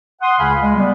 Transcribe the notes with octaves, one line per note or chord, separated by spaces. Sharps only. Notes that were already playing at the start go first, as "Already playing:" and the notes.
F#5 C6 D#6
C#2 C#3 F5 G#5 B5
G#3
G3 B3